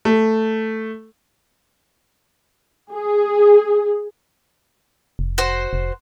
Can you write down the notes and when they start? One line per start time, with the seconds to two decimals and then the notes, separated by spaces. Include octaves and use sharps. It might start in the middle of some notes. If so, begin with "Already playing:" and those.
0.05 A3
2.92 G#4
5.19 F1
5.38 F#4 C5
5.73 F1